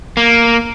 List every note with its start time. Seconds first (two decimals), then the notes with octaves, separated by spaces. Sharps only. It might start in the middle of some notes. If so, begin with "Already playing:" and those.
0.17 A#3